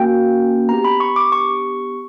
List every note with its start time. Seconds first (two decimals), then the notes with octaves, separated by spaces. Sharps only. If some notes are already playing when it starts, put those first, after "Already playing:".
Already playing: A#3 C#4 F#4 G5
0.69 B3 D4 G4 A#5
0.85 B5
1.00 C#6
1.16 D6
1.32 C#6